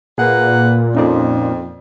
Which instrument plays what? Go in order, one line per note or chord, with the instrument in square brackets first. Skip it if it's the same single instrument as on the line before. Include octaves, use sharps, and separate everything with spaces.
[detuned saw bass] A#2 [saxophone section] A#3 B4 F#5 [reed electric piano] G#4
[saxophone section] F2 [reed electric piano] C#4 D#4 D5